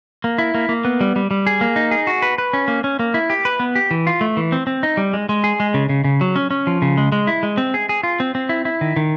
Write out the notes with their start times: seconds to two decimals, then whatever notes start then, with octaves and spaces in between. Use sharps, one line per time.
0.24 A#3
0.38 E4
0.55 A#3
0.69 A#3
0.85 B3
1.01 G3
1.16 G3
1.31 G3
1.47 G#4
1.61 A#3
1.76 D#4
1.91 G#4
2.07 F#4
2.22 B4
2.38 B4
2.53 C#4
2.68 A#3
2.84 C#4
2.99 A#3
3.14 E4
3.30 G4
3.45 B4
3.60 B3
3.75 G4
3.91 E3
4.07 F4
4.21 A3
4.37 E3
4.52 C4
4.67 C4
4.83 D#4
4.97 G3
5.13 G#3
5.29 G#3
5.44 G#4
5.60 G#3
5.74 C#3
5.89 C#3
6.04 C#3
6.21 F#3
6.36 C#4
6.51 C#4
6.67 F3
6.82 C#3
6.97 G#3
7.12 G#3
7.27 E4
7.43 G#3
7.58 C4
7.74 G#4
7.89 G#4
8.03 F4
8.20 C4
8.35 C4
8.49 E4
8.65 E4
8.81 D#3
8.96 D#3